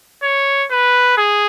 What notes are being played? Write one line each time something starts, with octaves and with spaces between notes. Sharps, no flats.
C#5
B4
G#4